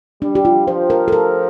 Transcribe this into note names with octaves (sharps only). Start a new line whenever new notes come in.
G3 D4
G4
F4
F3 C5
A#4
A4
A#4